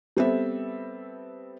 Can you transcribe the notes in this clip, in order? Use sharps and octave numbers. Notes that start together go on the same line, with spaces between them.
G3 B3 C4 A4 B4 E5